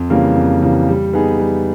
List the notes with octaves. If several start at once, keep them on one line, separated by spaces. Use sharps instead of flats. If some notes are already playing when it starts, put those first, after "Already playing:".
Already playing: F2
C#3 E3 G3 A#3
F2
C#3 E3 G3 A#3
G3
B3 D#4 G#4
G3